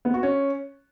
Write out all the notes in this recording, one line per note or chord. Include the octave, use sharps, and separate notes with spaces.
B3
F#4
C#4